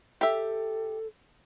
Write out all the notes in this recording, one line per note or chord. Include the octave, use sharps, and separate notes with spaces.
G4 A4 E5